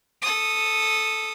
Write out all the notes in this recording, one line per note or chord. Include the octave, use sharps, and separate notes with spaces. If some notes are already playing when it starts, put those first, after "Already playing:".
A4 D#6